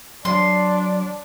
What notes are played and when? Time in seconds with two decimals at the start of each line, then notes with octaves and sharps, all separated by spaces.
0.25 F#3 D4 C6